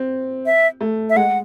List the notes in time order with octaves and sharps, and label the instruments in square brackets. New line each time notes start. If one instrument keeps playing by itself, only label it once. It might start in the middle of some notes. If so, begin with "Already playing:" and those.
Already playing: [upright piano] C4
[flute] E5
[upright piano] A3
[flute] E5
[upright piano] G#3 [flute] F#5